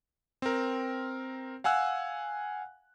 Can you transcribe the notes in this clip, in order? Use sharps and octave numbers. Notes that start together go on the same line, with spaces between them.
C4 A#4
F5 F#5 G#5 E6 F#6